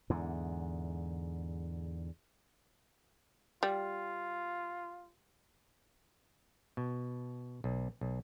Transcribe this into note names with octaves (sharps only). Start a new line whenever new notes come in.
E2 G#2 D3
G3 F4
B2
B1
B1